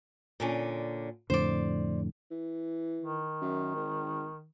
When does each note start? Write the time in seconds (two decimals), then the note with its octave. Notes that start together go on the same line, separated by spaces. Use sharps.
0.40 A#2 D3 C#4
1.30 F2 A2 D3 C5 D5
2.31 E3
3.02 D#3
3.41 F#2
3.76 G#1